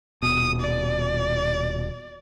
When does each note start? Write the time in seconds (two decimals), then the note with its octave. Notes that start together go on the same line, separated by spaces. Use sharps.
0.23 D#1 B2 D#6
0.60 D5